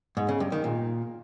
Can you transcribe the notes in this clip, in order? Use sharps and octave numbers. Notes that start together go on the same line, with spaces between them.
G#2
C#3
G2
D#3
A#2